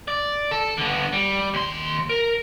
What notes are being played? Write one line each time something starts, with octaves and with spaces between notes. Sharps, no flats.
D5
A4
D3 B3
G3
D#2 C6
A#4